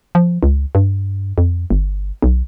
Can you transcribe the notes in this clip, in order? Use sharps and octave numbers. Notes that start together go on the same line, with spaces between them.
F3
C#2
G2
F2
G1
B1